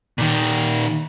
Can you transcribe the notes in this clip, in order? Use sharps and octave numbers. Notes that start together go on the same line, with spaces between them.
A#2 D#3